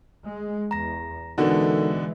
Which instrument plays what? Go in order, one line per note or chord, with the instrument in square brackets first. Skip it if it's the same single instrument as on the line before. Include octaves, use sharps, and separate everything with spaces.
[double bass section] G#3
[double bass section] E2 [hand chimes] A#5 A#6
[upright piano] B2 D3 F#4 [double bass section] E3 G#3 [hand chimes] D#4 A4 A#4